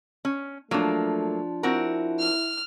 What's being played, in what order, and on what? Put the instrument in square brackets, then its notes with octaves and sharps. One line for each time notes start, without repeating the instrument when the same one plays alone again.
[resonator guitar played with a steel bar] C#4
[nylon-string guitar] F3 D4 [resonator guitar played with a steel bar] F#3 A#3 [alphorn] A3
[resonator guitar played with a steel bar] C4 F#4 A#4 [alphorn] E4
[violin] F6